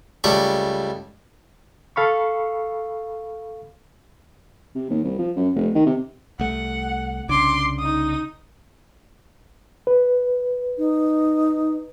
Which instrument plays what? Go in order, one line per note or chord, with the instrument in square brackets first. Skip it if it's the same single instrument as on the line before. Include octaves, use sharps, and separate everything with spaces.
[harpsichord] C#2 G3 A3 D5 C#6
[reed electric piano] A4 F5 B5 C#6
[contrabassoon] C3
D#2
C2
F3
F#2
F1
D#3
C3
[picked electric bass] C2 A3 [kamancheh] F#5
[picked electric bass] C2 C#3 D4 [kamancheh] C6 D6
[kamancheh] D#4 D#6
[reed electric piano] B4
[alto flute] D#4